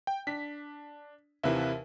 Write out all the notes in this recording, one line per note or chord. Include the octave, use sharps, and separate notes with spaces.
G5
D4 B6
D#2 C3 E3 A#4 B4 E5